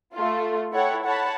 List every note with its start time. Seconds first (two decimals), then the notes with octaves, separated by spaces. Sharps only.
0.14 A3 F4
0.73 E4 A4 C#5 F#5 G5
1.04 C#5 F#5 A5 B5